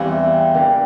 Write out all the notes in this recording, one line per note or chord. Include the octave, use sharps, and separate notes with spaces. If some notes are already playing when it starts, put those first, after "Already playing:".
Already playing: E2 E3 G3 C4 F5
E5
G5
E3 A#3 D4 G4 G5